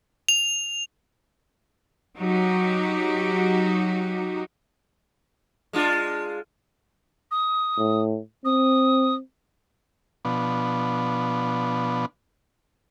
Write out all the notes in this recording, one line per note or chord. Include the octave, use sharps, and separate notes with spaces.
F7
F#3 D#4 F#4 G4
G#3 D4 F4
D#6
A2
C4 D#6
B2 F3 B3 D4